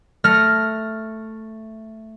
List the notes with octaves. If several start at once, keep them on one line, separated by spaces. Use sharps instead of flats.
A3 F6 A#6